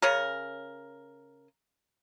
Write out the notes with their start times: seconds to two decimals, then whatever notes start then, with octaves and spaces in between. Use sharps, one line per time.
0.02 C#3 C#4 A#4